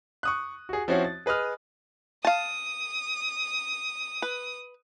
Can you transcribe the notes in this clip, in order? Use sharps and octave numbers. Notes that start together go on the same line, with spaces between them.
C#6 D#6 F#6
F#4 G#4
F3 C4 C#4 E4 F#4 C#5
A6
G#4 B4 D#5 D#6 F6
F5 A5 D#6
B4